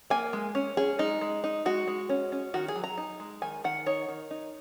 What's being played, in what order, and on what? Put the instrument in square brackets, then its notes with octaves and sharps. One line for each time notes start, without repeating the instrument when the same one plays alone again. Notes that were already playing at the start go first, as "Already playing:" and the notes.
[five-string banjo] A#3 G#5
G#3
C#4
C#4 G#4
G#3 D#4
G#3
D#4
G#3 F#4
G#3
C#4
C#4
D#3 F#4
G#4
F#3
A#5
D#4
G#3
D#3 G#5
D#3 F#5
D#4 C#5
D#3
D#4